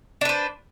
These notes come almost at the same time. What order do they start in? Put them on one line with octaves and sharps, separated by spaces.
D4 B4 C5